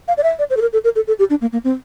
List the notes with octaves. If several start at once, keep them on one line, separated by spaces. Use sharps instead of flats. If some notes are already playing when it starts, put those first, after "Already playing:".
F5
D5
E5
D5
C5
A4
A#4
A4
A#4
A4
A4
G4
D4
A#3
A#3
C4